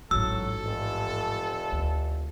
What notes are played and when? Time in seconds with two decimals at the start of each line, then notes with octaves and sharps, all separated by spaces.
0.11 A1 G#2 F#3 A4 E6
0.64 F1
1.72 D2